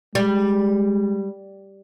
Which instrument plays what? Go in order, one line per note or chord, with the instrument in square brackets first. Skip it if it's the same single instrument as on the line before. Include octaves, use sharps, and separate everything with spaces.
[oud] G3 [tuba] G#3